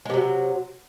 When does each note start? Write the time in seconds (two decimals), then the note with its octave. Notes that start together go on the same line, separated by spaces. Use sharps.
0.05 G#3
0.10 C3
0.14 F#3